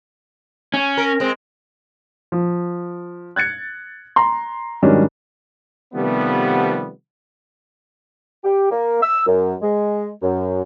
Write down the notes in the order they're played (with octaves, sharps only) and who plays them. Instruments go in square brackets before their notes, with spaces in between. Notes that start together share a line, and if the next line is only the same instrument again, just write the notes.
[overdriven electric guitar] C#4
[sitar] A#4
G#3 C4
[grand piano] F3
F#6 G#6 A6 C#7
A#5 C6
G#2 D#3 F#3 G3 C#4 D4
[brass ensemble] C3 D#3 F3 G3 A3 B3
[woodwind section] G4
A#3
E6
F#2
G#3
F#2